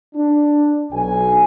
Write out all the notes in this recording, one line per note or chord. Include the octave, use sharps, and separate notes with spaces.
D4
B1 G#5